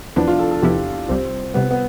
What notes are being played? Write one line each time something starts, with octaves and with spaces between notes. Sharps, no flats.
E2 C3 F3 B3 D4 E4
F4
A4
A4
E2 C3 F3 B3 E4 G4
C2 C3 G3 C4
C2 C3 G3 B3
B3